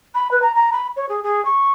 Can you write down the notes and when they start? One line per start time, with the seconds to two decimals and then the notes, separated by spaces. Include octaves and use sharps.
0.14 B5
0.31 B4
0.42 A#5
0.54 A#5
0.72 B5
0.96 C#5
1.08 G#4
1.23 G#4
1.45 C#6